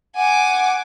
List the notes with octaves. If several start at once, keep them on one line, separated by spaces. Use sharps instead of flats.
F#5 G#5 D6